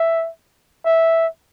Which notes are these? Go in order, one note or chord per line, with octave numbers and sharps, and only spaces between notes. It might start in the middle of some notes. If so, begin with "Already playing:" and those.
Already playing: E5
E5